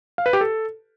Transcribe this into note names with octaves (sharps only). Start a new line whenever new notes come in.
F5
B4
G4
A4